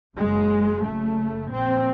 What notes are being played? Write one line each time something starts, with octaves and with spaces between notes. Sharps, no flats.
F#1 F#2 C#3 G#3
F#1 F#2 C#3 A3
A#1 A#2 C4